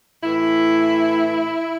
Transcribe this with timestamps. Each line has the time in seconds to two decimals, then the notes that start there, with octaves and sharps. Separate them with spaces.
0.23 A2 E3 E4